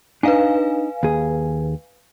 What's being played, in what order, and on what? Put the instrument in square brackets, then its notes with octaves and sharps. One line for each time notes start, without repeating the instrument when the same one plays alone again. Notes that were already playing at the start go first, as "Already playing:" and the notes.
[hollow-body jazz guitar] D4 D#4 [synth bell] B4 F5 G#5
[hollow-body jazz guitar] D#2 G#4